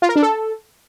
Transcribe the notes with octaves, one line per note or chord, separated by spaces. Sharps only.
F4
A#4
D4
A4